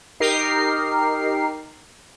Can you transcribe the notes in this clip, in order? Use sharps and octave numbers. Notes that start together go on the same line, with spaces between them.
D#4 G4 A#4 C7